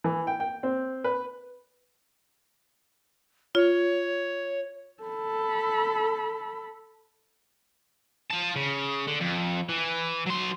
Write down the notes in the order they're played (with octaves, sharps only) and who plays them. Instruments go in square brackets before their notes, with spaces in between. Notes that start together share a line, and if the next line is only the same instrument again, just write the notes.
[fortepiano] E3
G5
G5
C4
B4
[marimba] F4 [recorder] C#5
[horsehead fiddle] A4 B5
[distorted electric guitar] F4 A5
C#3
D3
F2
E3
F#3 C6